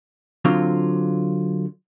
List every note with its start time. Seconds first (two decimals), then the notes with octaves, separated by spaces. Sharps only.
0.45 D3 F#3 C4 F4